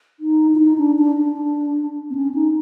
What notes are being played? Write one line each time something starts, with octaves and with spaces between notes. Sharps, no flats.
D#4
E4
D#4
D4
D4
D4
C4
C#4
D#4